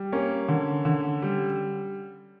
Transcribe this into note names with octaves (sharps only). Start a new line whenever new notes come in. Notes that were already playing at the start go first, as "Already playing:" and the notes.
Already playing: G3
A#3 C#4
D3
D3
G3